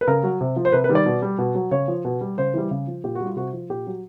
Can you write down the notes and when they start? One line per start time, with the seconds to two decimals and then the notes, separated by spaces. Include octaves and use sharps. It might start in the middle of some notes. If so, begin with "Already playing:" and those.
0.01 B4
0.08 C#3 A#4
0.23 F#3
0.41 C3
0.56 F3
0.65 C5
0.72 C3 B4
0.84 B4
0.89 D#3 G3
0.95 D5
1.06 B2
1.22 G3
1.38 B2
1.55 F#3
1.71 C#3 C#5
1.88 F3
2.05 B2
2.21 G3
2.38 C#3 C5
2.54 E3 G3
2.71 C#3
2.87 F3
3.04 A#2 G4
3.15 F#4
3.21 G3
3.26 F4
3.36 C3 F#4
3.53 F3
3.70 A#2 G4
3.87 F#3